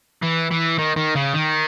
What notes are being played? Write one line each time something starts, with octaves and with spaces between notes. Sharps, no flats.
E3
E3
D#3
D#3
C#3
D#3